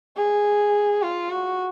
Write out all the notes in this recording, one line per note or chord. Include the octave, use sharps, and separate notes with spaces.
G#4
F4
F#4